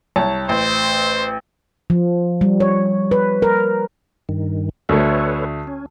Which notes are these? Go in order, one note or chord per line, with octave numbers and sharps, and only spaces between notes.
C2 C#5 A5
A1 C5
F3
G3
C#5
B4
A#4
G2 D#3
D2 A3 A4 B4 C#5
C#4